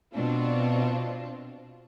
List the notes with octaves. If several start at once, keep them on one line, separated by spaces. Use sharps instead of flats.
B2 C4 D4 F4